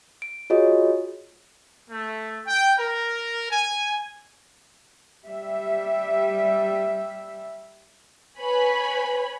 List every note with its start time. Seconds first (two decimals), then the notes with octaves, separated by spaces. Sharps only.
0.22 D7
0.50 F4 F#4 G#4 C#5 D#5
1.89 A3
2.46 G5
2.78 A#4
3.51 G#5
5.24 G3 E5
8.39 B4 C#5 G#5 B5